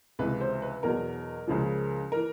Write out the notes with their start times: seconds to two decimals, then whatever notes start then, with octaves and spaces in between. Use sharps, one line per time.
0.19 C#2 C3 E3 B4
0.40 C5
0.62 B4
0.83 E2 B2 F#3 A#4
1.47 C#2 C#3 F3
2.12 E3 A#4